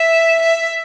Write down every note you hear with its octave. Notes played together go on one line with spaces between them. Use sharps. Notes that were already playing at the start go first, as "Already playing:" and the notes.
Already playing: E5
E5